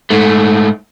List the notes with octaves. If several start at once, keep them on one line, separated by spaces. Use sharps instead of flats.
G#2 A3